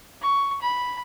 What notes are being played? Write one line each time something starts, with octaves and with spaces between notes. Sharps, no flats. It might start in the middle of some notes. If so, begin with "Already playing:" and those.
C#6
B5